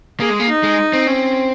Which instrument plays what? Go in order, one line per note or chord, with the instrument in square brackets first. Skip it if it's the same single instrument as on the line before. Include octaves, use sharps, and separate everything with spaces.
[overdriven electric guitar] A#3 [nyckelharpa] G#4
[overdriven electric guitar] G#3
A#3
[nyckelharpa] D#4
[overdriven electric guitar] G#3
C4
[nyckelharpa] C#4